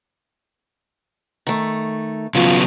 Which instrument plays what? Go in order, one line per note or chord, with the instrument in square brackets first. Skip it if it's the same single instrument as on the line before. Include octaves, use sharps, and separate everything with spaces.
[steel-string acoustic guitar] D#3 A3
[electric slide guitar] C#3 F#3 B3 [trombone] F4